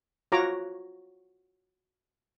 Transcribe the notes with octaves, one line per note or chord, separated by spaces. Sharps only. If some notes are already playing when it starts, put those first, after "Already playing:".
F4 F#4 C#5 A#5 D6